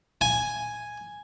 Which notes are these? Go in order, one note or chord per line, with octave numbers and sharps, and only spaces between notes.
G#5